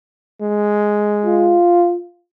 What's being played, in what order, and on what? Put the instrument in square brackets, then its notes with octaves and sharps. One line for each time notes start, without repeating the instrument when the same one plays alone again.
[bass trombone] G#3
[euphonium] F4